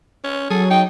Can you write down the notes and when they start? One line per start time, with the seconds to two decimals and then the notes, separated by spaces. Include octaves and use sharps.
0.24 C#4
0.50 F#3 G#4 A4
0.70 D#4 G5